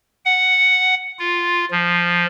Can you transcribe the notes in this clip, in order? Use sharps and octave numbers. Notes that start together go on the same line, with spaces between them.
F#5
F4
F3